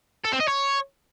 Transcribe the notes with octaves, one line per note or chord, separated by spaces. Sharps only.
A4
C4
D#5
C#5